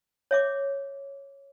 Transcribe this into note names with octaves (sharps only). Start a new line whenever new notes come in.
C#5 E5 D6